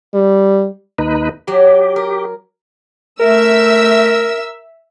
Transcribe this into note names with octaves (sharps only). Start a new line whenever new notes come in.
G3
D#2 D#4 B4
F#3 G4 C6
A#4
A3 A#4 E5 E6